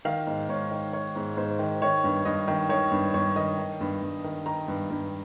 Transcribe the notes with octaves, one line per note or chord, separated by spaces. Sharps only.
D#3 F5
G#2
G#2 C#5
D#3
D#3 C#5
G#2
G#2 C5
D#3
D#3 C#5
G2
G2 D#5
D#3
D#3 C#5
G2
G2 C#5
D#3 D#5
D#3
G2
G2
D#3
D#3 A#5
G2
G2